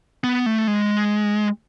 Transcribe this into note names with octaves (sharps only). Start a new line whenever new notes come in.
B3
A3
G#3